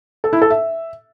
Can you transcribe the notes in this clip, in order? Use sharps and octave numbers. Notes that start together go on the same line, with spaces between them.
A4
E4
A4
E5